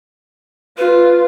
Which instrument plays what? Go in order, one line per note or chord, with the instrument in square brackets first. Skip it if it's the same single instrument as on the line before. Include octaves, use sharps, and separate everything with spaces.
[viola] F4 [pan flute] B4